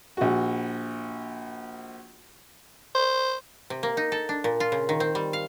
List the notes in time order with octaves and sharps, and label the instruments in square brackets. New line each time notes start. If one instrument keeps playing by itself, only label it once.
[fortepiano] A#1 F#4
[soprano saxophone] C5
[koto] C3
A#3
D#4
A4
D4
A#2
F4
C#3
D#3
C4
G3
F5